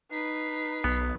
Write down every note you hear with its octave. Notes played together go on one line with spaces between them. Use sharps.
D#4 B4 B6 C7
B1 B3